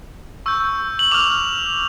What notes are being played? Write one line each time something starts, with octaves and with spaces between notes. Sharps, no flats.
C#6 E6 G6
F#7
D6 F6 F7